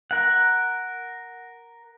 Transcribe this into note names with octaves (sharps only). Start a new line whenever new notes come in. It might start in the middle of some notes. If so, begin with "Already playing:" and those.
A#4 F#5